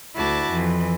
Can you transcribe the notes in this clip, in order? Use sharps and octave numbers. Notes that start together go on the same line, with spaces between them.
D2 D4 E4 F#4 A5 D6
F2 E3